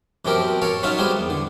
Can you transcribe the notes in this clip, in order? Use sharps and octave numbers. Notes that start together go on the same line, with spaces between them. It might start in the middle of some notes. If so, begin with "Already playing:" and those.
F#2 B2 F3 C4 G4 A#4
A4 A#4 C#5 F5
F#3 C#4 D#4 F4 E5 F5
G3 G#3 B3 C4 G#4 C5
E2
D3